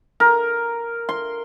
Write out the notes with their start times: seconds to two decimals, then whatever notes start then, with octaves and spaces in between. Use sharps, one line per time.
0.20 A#4
1.09 C6